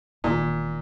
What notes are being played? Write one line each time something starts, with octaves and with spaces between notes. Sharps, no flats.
E1 A#2 D#3